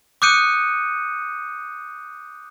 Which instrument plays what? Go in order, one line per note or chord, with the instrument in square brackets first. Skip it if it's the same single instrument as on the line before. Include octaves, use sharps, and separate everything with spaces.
[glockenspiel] D6 D#6 F#6 G6 C#7 D#7